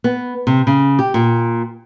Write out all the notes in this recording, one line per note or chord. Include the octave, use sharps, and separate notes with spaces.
B3
C3
C#3
G4
A#2